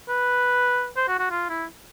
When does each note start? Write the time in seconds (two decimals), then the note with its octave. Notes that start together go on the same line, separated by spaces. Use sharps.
0.09 B4
0.97 C5
1.08 F#4
1.19 F#4
1.31 F4
1.49 E4